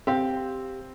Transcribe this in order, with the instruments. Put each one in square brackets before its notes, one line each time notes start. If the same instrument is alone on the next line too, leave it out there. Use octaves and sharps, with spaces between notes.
[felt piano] C4 [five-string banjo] G4 F5